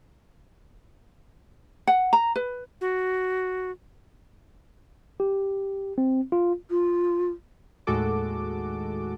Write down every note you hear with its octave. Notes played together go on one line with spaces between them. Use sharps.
F#5
A#5
B4
F#4
G4
C4
F4
F4
D#2 A2 G#3 F#4 A4 D6